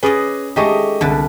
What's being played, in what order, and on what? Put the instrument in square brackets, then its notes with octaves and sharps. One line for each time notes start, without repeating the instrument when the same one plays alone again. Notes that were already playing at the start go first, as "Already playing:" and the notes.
[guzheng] C#4 D5 D#5 [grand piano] G#4 B4
[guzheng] G#3 A3 D#4 [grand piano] G4 D#5 C#6
[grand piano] C2 [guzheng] D3 A4 B4